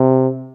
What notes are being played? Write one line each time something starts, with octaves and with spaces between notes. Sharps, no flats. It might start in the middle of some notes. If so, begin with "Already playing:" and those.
Already playing: C3